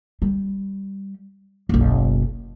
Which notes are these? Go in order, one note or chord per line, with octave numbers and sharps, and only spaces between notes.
G3
F#1 B1